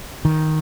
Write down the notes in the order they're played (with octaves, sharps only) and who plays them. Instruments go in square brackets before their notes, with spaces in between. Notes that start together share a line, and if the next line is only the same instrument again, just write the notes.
[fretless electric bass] D#3